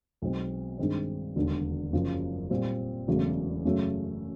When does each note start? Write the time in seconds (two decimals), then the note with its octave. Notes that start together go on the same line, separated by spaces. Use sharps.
0.22 B1 B2 G#3 C4
0.78 G2 D#3 G#3 C4
1.36 E1 D#2 D3
1.93 F#1 F#2 C#3 F3
2.50 A#2 G3 C4
3.08 E1 E2 C#3 F#3 A3
3.65 F#2 C#3 F#3 A3 C#4